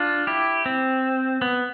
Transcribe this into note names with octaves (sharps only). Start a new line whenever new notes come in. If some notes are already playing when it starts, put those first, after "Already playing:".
Already playing: D4 F4
E4 G4
C4
B3